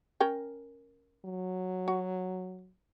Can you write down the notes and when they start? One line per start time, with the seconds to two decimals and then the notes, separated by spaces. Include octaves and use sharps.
0.20 C#4 A#4 G5
1.25 F#3
1.88 F#4